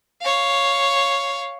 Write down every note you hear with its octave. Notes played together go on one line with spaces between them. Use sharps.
C#5 F5